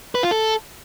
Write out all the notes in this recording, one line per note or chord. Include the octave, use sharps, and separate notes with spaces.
B4
F4
A4